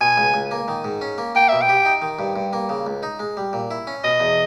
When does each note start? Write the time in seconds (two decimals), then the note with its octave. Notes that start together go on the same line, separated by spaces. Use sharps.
0.01 B2 G#5
0.17 C#2
0.34 C#2
0.51 A#3
0.68 D#3
0.84 G#2
1.01 C#4
1.18 A#3
1.35 A#3 G5
1.48 B2 E5
1.61 G5
1.69 G4
1.85 D#4
2.02 D#3
2.19 G2
2.36 G2
2.53 A#3
2.69 C#3
2.86 C#2
3.03 D#4
3.19 G#3
3.37 G3
3.53 A#2
3.71 E4
3.87 C#4
4.04 B2 D#5
4.20 E2